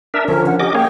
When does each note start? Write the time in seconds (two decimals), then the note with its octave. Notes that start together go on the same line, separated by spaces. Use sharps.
0.14 D4 A#4 E5
0.28 D3 F3 C#4 A#4
0.46 F#5
0.60 C#4 G4 D#5 D6
0.75 A#3 G#4 C#5 G5